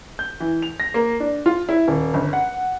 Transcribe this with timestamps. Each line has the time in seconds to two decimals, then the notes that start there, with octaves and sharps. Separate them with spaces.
0.19 G6
0.40 E3
0.62 F7
0.80 A#6
0.94 A#3
1.20 D4
1.46 F4
1.69 E4
1.88 D#1
2.14 G1
2.33 F#5